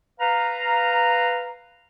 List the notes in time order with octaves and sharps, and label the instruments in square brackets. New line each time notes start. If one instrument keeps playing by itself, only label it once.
[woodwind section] B4 F5 A#5